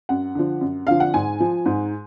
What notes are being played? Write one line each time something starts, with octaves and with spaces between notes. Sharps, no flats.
F#2 F#5
D3 F3
F#2
D3 F3 F5
F#5
G#2 G#5
F3
G#2